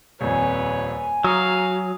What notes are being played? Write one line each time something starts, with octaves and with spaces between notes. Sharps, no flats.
D#1 F2 B4 C#5 G#5
F#3 F#4 F5 A#5 C#6 D#6